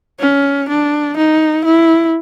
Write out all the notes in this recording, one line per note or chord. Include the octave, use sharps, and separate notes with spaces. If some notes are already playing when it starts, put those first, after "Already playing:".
C#4
D4
D#4
E4